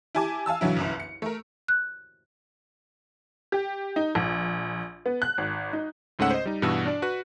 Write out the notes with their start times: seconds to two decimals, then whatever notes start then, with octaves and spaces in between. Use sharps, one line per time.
0.15 E4 G4 G#5 A5 D6
0.46 F5 G#5 A5 E6
0.61 B1 D3 E3 F#3 E4
0.77 G1 C2 F#2
1.00 C#7
1.22 A3 A#4
1.68 F#6
3.52 G4
3.96 D#4
4.15 A#1
5.06 B3
5.22 F#6
5.38 G#1
5.73 D#4
6.19 C#2 G#2 A3 C#4 F#5 E6
6.31 C5 D#5
6.45 G3 D#4
6.62 G2 B2 E3 F#4 E6
6.85 D4 D5
7.02 F#4 B4 F#6